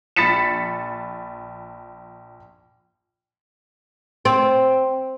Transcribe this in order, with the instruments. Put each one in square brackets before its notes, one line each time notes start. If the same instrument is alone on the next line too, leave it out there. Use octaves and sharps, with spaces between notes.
[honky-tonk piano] A#1 B5 A6 B6 C#7 E7
[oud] C4